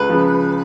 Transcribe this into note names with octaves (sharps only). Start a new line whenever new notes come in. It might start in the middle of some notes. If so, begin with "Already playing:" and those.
Already playing: C#2 B4
C#3 F3